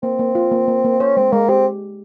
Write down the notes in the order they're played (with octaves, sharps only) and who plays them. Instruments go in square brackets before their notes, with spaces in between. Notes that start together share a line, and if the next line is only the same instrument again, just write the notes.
[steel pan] A#3 [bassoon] C4
[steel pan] A#3
F4
A#3
A#3
A#3
[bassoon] C#4 [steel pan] C5
[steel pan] G#3 [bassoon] C4
[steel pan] G#3 [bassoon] A#3
[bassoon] C4 [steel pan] G4